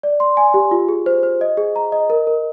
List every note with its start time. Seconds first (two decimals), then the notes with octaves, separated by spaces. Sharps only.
0.03 D5
0.20 C6
0.37 G#5
0.54 G4
0.71 F4
0.88 G#4
1.06 C5
1.23 C5
1.41 D#5
1.57 G#4
1.76 A#5
1.92 D#5
2.10 A#4
2.27 A#4